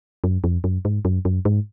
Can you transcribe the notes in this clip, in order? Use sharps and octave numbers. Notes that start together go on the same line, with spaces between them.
F#2
F2
F#2
G#2
F#2
F#2
G#2